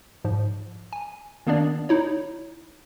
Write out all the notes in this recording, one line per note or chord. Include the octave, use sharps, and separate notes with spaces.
G#2 F3
G#5
D#3 A#3 B3 D4 D5
D#4 E4 C#5